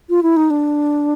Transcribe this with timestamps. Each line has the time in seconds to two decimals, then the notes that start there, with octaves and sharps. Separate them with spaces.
0.10 F4
0.23 E4
0.37 D#4
0.50 D4